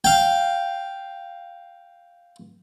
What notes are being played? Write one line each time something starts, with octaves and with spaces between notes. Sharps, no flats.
F5 G5